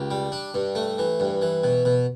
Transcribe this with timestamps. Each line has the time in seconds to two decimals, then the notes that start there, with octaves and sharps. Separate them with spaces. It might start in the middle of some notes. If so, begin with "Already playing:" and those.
Already playing: C#2 G4
0.11 G3
0.32 D4
0.54 G2
0.75 A3
0.99 E3
1.20 G2
1.42 E3
1.64 B2
1.85 B2